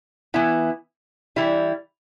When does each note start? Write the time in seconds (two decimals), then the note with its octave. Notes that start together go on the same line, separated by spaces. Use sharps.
0.34 E3 B3 E4
1.36 E3 G3 E4